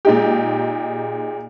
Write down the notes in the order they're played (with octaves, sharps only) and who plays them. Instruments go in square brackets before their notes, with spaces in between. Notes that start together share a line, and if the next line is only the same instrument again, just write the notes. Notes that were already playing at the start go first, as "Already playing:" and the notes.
[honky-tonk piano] A#2 G#3 D#4 G4